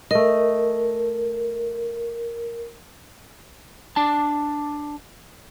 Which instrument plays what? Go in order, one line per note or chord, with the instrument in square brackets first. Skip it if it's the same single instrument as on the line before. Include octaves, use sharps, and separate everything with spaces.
[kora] A3 D#5 [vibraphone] A#4
[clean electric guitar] D4 A5